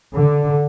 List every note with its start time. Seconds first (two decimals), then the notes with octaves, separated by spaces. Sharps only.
0.14 D3